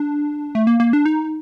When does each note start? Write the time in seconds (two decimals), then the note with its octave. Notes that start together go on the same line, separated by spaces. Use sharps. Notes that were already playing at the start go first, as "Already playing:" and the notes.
Already playing: D4
0.55 A3
0.67 A#3
0.80 A#3
0.93 D4
1.06 D#4